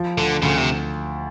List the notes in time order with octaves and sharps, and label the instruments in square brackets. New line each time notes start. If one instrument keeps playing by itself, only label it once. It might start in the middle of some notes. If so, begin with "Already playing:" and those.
Already playing: [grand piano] F3
[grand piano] D2 [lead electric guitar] D3
[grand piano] D2 [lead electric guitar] C#3
[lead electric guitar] C3